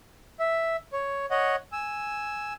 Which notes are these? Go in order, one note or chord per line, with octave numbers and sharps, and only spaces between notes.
E5
C#5
C#5 D#5 F#5
G#5 E6